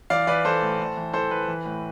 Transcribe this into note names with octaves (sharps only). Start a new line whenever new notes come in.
E3 D5 F5
E3 B4 D5
E3 A4 C5
A2
A2
E3
E3 A4 C5
E3 B4
E3
A2